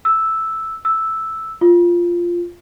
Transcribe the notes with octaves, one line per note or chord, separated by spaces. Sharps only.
E6
E6
F4